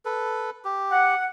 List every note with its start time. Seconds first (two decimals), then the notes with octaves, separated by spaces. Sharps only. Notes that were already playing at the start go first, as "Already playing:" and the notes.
0.05 A4 B4
0.65 G4
0.91 F#5